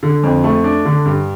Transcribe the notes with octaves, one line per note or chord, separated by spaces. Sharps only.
D3
F2
A3
D4
D3
G2